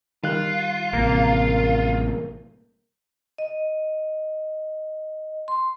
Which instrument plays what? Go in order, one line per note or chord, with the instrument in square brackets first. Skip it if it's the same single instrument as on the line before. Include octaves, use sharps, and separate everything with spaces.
[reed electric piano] D#3 G3 F#6 [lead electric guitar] F4
[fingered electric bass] A1 C3 [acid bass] A#3
[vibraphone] D#5
C6